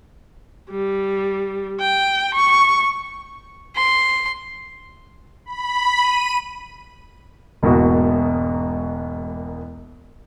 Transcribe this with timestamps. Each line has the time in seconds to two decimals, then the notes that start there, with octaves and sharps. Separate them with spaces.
0.70 G3
1.80 G5
2.35 C#6
3.76 C6
5.45 B5
6.00 D#7
7.63 E1 G#2 B2 A#3 E4 F#4